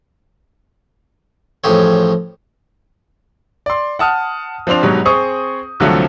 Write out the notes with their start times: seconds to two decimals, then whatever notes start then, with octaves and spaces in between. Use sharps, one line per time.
1.64 A1 A2 F3 G4 G#4 C#5
3.66 D5 C6
3.99 F#5 A5 D#6 F6
4.67 F3 C4 D4 C6 F7
4.83 G#2 B2 F#3 G3
5.05 C4 G#4 C5 C#6 D#6
5.80 C2 D3 F3 F#3 A3 C4